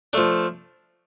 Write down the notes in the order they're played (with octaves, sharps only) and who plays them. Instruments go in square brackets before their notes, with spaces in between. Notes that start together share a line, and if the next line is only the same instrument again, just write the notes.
[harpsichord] F3 A3 D4